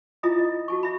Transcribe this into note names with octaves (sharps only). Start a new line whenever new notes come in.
E4 F4 D#5 E5 A#5 D#6
F4 D#5
F#4 A5 C#6
E5 B5